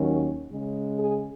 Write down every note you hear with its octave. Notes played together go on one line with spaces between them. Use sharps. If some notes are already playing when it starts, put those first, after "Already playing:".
Already playing: D#2 D#3 F#3 C#4
C#3 G#3 C#4
G#4